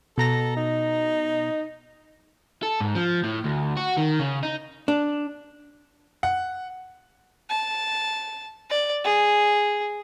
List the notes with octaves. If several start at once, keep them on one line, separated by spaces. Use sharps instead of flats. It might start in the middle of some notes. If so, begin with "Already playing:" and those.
B2 A4 A#5 A#6
D#4
A4
G#2
F3
A2
D2
F#4
D#3
C#3
D#4
D4
F#5
A5
D5
G#4